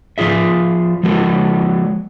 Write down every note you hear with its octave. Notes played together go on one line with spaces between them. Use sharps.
F3 F4 G#4 E5
F3 G#3 F#4 A#4